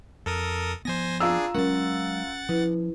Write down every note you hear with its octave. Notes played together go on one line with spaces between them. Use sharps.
F2 A4 A#4 D#6
F3 B3 C5 G#5 A#6
D4 F4 G#4 A#5 E6
F#3 G#3 C#4 A#4 F#5 A6
F3 E4 B4